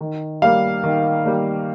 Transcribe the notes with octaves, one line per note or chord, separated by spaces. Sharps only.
D#3
G3 A#3 F5
D#3
G3 A#3